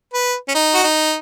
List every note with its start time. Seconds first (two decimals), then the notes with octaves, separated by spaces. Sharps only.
0.14 B4
0.49 C#4
0.54 D#4
0.74 F#4
0.84 D#4